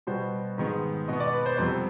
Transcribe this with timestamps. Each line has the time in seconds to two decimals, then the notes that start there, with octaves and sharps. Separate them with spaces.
0.07 B2 G3 B3 C5
0.58 G#2 D#3 G#3 B3
1.08 B2 B3 D#5
1.20 D5
1.33 B4
1.46 C5
1.58 F2 C3 G3 B3 C5